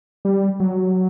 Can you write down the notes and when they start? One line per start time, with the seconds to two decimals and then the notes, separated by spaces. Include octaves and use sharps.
0.25 G3
0.60 F#3